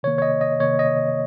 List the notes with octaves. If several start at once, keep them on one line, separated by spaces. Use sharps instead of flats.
C3 D#3 A#3 C#5
C#5
D#5
D#5
C3 D#3 A#3 C#5
D#5